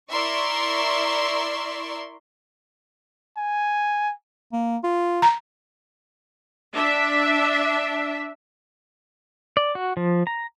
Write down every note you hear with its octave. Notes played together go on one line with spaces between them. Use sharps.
E4 A#4 D5 E5 C6 C#6
G#5
A#3
F4
A#5
D4 E5
D5
F#4
F3
A#5